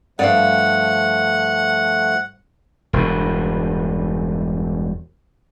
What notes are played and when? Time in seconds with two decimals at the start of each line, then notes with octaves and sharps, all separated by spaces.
0.19 G2 F3 A3 D5 F5 F#5
2.93 E1 G2